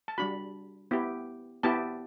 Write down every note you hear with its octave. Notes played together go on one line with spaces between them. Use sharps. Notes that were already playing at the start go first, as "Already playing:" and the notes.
A5
G3 D4 F#4 B5
B3 E4 G4
B3 E4 G4 A5